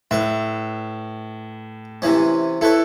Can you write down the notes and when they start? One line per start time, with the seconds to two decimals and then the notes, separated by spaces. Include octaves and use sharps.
0.11 A2 B4 E5
2.02 C3 E3 C#4
2.61 E4 A4 B4 C#5